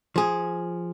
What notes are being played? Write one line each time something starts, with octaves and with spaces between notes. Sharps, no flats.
F3 G#4